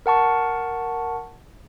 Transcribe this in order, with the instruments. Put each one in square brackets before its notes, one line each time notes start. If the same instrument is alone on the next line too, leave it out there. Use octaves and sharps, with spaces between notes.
[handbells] A#4 F#5 A5 C#6